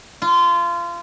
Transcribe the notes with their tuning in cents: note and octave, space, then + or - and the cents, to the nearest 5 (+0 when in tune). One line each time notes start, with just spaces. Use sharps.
F4 -25